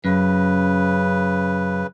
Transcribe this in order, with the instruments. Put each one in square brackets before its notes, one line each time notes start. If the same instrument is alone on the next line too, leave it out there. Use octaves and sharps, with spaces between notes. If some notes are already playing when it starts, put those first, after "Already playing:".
[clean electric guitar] F#2 [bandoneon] C#3 B4